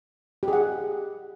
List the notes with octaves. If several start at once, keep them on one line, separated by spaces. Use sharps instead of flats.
G4
G#4
F#5